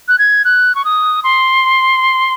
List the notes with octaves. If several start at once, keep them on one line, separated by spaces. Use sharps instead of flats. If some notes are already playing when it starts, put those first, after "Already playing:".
F#6
G#6
F#6
C#6
D#6
C6